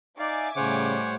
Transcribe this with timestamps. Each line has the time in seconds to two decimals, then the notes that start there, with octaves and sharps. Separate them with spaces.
0.19 D#4 D5 E5 F5 G#5 D6
0.56 A2 C#3 G3 C5 C#5 F#5